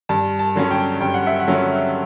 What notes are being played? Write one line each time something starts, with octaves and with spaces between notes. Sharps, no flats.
G2 A5
A5
D3 F#3 C#4
G5
G2 G5
F#5
E5
F#5
D3 F#3 C#4